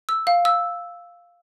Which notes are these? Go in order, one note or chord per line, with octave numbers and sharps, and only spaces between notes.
E6
F5
E6